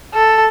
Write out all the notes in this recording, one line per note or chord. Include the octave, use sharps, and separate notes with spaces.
A4